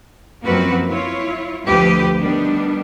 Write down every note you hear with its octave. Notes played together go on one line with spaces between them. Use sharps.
F#2 F3 A#3 C4 F#4 B4
E4 F4 C#5
D2 F3 A3 G4 B4
D#3 G3 B3 D4